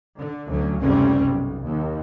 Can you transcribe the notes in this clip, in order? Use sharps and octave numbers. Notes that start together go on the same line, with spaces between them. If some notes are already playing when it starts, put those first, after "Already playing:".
D3
D2 F#3 C#4
F#1 D2 C3 G3 C4 C#4
B1
D#2